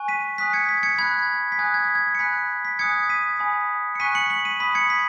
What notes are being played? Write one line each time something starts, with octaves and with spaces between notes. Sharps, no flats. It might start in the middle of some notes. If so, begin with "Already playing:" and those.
Already playing: G#5 C#6 F#6
B6 D#7
G#5 D#6 F#6 B6
G#6 C#7
B6
G#6 C#7
B5 F#6 G#6
B6
G#5 D#6 F#6 G#6
G#6
B6
G#6
C#7
G#5 B5 F#6 B6
B6
G#5 D#6 F#6 G#6 C#7
B6 D#7
G#5 B5 D#6
C#7
G#5 C#6 F#6 B6 D#7
C#7 F#7
C#7 F#7
B6 D#7
B5 D#6 F#6 B6 D#7
G#6 C#7
B6